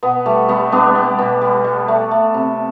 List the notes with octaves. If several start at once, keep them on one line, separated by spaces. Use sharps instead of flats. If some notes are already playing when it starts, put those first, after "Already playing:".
B2 B3
G3 A3
G3 B3
G3 B3 D4
G3
B2
G3
G3
A3
A3
C3